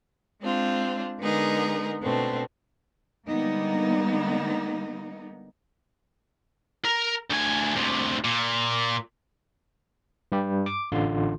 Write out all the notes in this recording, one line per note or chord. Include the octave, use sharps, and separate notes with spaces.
G#3 C4 D4 F4
D3 G#3 B3 D#4 G#4 A#4
B2 A3 C4 D4
D3 G3 G#3 A#3 B3 D#4
A#4
D2 G#5
D2 C3
A#2
G2 G3 G4
D6
A1 D3 F4 C6